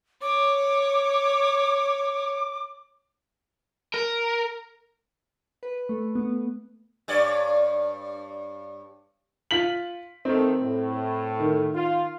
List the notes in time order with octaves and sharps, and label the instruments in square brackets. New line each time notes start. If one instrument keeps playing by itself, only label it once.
[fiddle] C#5 [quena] D6
[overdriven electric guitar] A#4
[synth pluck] B4
A3
B3
[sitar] G2 C#5 D5
[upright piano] F4 B6 F#7
[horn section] D#3 A3 [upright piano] C4
[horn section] A2
[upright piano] D#3
[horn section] F4